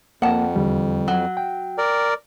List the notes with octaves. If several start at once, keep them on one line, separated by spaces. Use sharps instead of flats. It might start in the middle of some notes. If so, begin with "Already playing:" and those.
F2 A#3 F#5 A5
E2 D3 G3
F#3
G5
A#4 D5